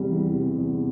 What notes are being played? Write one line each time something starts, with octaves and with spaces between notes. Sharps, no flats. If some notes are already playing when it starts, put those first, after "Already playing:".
Already playing: E2 C3 G3
E3
C3
E2